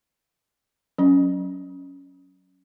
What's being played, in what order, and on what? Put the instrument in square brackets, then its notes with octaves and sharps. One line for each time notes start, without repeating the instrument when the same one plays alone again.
[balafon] F#3 C#4